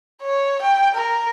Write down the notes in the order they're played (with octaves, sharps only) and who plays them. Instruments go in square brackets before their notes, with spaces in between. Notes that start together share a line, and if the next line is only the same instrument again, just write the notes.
[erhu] C#5
G5
A#4